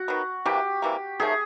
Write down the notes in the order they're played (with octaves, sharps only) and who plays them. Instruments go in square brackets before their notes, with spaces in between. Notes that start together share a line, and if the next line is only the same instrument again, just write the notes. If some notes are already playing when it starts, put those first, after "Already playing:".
Already playing: [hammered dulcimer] F#4
[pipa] D#3 F#3 B3
[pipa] C3 E3 G3 A#3 [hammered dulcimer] G4
[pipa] C3 E3 G3 A#3
[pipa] C3 D#3 F#3 A3 [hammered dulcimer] G#4